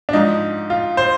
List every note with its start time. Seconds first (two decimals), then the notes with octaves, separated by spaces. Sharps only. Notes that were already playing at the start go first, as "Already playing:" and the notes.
0.09 D4
0.13 G#2 F3 D#4
0.70 F4
0.97 C5